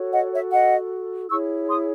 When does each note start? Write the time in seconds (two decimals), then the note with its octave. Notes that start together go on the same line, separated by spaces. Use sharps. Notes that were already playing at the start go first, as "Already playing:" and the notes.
Already playing: F#4 A4 C#5
0.13 D#5 F#5
0.32 C#5 E5
0.52 D#5 F#5
1.30 E4 G#4 C#5 C#6 E6
1.69 C6 D#6